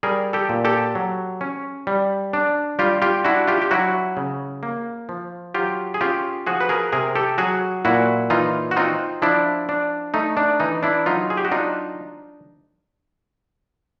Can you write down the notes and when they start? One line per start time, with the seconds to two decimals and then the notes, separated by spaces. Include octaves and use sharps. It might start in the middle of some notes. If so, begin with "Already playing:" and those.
0.03 G3 G#4 A#4
0.33 G4 A4
0.49 A#2
0.65 G4 A4
0.95 F#3
1.41 C#4
1.87 G3
2.33 D4
2.79 G3 F4 G4
3.02 F4 G4
3.25 D4 E4 F#4
3.48 F4 G4
3.62 G4
3.71 F#3 E4 F#4
4.17 C#3
4.63 A#3
5.09 F3
5.55 F#3 F4 G4
5.94 G#4
6.01 C#4 F4 G4
6.46 F3 F#4 G#4
6.61 B4
6.69 G#4 A#4
6.92 C3 G#4 A#4
7.15 G4 A4
7.38 F#3 F#4 G#4
7.85 A#2 E4 F#4
8.30 E3 D#4 F4
8.71 F#4
8.76 C4 D#4 F4
9.22 F3 D4 E4
9.69 D4
10.14 A3 D#4
10.37 D4
10.60 E3 D#4
10.83 D4 E4
11.06 F#3 D#4 F4
11.30 G#4
11.37 G4
11.45 F#4
11.52 D4 D#4 F4